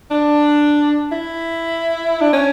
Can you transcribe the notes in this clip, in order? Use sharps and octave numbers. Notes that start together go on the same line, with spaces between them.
D4
E4
D4
C#4